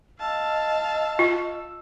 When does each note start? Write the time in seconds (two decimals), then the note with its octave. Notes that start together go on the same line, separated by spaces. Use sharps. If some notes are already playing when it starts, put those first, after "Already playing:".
0.20 D#5 F5 A5 E6
1.19 F4